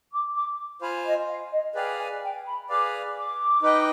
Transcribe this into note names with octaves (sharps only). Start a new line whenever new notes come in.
D6
D6
F4 C5 F5 G#5 B5
D#5
F5
D#5
G#4 B4 D5 F5 G5
G#5
G5
B5
G#4 B4 D5 F5 D6
D6
D#4 B4 D#5 G5